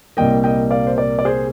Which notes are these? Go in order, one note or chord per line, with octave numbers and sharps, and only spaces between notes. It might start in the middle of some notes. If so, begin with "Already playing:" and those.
C2 A#2 G3 A#3 D#5 G5
D#5 G5
D5 F5
C5
A#4 D5
D5
G#4 C5